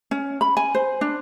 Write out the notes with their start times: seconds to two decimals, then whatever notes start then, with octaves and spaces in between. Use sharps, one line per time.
0.11 C#4
0.41 B5
0.57 G#5
0.75 C5
1.01 D4